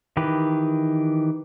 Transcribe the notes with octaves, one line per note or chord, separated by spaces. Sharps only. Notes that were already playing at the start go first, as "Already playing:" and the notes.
D#3 E3 G4 B4